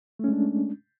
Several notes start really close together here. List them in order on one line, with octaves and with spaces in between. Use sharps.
A3 C#4 G#3 D4